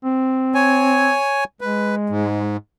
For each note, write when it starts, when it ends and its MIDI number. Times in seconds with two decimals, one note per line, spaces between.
0.04 1.15 60
0.55 1.44 73
0.55 1.44 80
1.61 2.55 56
1.61 1.95 71
2.09 2.57 44